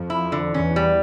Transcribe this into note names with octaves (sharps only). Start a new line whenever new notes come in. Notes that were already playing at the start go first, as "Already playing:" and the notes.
Already playing: F2 F3
E4
D3
E2 E3 C#4
G3